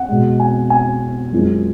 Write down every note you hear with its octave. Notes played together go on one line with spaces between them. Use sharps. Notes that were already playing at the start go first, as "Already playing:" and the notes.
Already playing: F#5
B2 G#3
G#5
G#5
F#2 F3 G#3